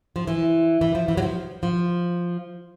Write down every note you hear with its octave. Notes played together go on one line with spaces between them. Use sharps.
F3
E3
E3
F3
E3
F#3
F3
F3